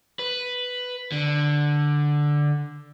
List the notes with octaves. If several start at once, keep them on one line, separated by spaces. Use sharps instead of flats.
B4
D3